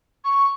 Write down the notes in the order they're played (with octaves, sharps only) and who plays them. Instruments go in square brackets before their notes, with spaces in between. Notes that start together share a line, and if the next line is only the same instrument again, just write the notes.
[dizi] C#6